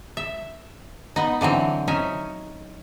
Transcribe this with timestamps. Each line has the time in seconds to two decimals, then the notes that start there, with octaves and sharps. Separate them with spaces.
0.17 E5
1.16 B3 D#4
1.41 D3 E3 F#3 C4
1.88 C#4 D#4 E5